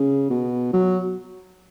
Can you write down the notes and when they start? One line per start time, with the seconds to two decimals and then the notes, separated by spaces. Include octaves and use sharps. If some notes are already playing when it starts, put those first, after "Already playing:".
Already playing: C#3
0.30 B2
0.73 F#3